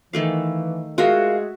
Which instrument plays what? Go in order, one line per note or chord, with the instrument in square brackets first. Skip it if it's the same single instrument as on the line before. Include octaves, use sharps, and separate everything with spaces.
[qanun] D#3 A3 F5 [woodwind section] E3
[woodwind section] G#3 G#4 [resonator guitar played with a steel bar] F4 A#4 F5 [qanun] F#4 E5